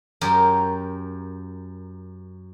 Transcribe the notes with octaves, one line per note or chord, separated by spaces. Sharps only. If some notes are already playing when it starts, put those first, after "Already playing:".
F#2 G4 A#4